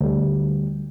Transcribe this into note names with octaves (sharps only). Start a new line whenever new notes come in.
D2 G3